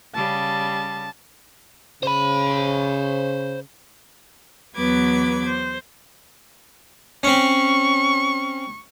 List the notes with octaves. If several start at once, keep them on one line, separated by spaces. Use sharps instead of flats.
C#3 G3 A5
C#3 C5 B5
E2 F#3 B3 B4 D6 G#6
C5
C4 C#4 C#6